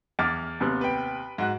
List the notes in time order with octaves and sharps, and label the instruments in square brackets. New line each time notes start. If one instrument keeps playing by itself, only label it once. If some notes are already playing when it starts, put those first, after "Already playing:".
[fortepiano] E2 [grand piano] D6 F6 A6
[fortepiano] D#2 C3 B3
[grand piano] B4 G5
G#2 F#4 F#6